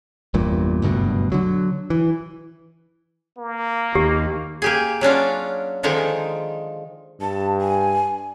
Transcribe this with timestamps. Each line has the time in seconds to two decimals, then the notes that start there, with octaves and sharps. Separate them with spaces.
0.34 G1 E2 G2 A#2
0.82 F#1 D2 G2 B2
1.32 D3 F#3
1.90 E3
3.38 A#3
3.95 D#2 G4
4.62 A#3 G4 G#4
5.01 F#3 C#4 D4 F4
5.83 D3 D#3 F3 G#3 D#4
7.21 G2 A5
7.61 G#5